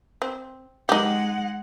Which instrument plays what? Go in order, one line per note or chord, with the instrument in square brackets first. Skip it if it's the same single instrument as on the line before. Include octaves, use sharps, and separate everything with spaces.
[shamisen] C4
[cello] G#3 F#5 [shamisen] D#4 G4